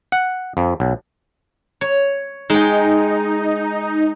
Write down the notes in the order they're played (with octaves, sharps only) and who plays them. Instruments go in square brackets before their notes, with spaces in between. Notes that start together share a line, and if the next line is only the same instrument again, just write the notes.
[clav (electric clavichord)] F#5
F2
B1
[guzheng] C#5
[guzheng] G#3 G5 [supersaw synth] D#4